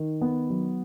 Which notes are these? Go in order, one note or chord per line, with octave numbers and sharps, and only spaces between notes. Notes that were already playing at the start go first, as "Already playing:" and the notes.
Already playing: D#3
B3
F#3